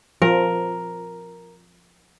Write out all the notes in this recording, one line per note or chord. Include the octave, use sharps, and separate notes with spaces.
F3 A#4